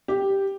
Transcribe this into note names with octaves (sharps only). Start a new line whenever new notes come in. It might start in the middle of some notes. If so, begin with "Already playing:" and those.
G4